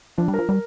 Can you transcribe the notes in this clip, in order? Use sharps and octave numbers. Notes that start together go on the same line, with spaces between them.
F3 D4
G3
F3 A#4
G3 A#4